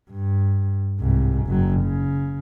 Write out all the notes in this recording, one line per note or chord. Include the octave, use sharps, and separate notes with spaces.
G2
C2 G#2
F#1 F#3
C#3